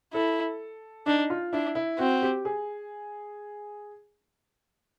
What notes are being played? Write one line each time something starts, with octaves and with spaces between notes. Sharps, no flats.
E4 A4
D4 D#4
F4
D4 E4
E4
C4 F#4
G4
G#4